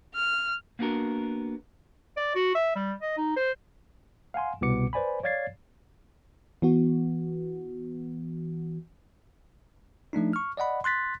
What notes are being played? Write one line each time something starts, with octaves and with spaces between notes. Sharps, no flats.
F6
A#3 B3 D4 F#4 A#4
D5
F#4
E5
G3
D#5
D#4
C5
F5 F#5 G#5 C6
C2 B2 B3 D6 C#7
B4 C5 D5 G#5 B5
C#5 D5 F5 G#6 A6 C7
E3 B3 F#4
F3 A3 D4 D#4
C#6 F6
D5 D#5 F#5 B5
C6 F#6 A6 B6